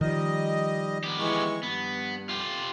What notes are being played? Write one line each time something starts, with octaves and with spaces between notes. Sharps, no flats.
D#3 F3 G3 D#5
B3 G4
E3 G#3 C#6
G2 B3
F4 G4